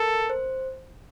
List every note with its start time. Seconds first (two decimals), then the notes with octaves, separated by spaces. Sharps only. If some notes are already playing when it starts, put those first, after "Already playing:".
Already playing: A4 A#4
0.30 C5